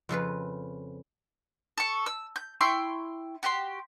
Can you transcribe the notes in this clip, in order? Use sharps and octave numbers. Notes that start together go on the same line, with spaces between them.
F2 C#3 F4 B4
A4 C#6
E6
G6
E4 G5 C6 C#6
F#4 G4 G5 C6